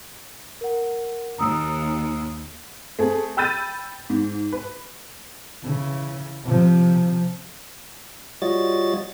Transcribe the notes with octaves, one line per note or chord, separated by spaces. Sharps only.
A#4 F#5
D#2 A#5 D#6 E6
A3 C4 G#4 A4
G5 B5 E6 G6 A6 D#7
G#2
B4
C#3 E3
C3 F3
G3 F4 F#4 C#5 D#5 A6